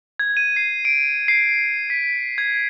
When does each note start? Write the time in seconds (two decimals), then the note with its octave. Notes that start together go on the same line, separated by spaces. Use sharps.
0.19 G#6
0.37 D#7
0.56 C7
0.85 D7
1.28 C7
1.90 B6
2.38 G#6